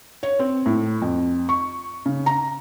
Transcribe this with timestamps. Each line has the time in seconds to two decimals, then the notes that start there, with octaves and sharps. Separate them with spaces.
0.23 C#5
0.39 C4
0.66 A2
1.02 F2
1.49 C#6
2.06 C#3
2.26 A#5